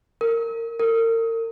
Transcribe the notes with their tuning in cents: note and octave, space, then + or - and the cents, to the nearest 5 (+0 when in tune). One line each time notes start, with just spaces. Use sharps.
A#4 -25
A#4 -40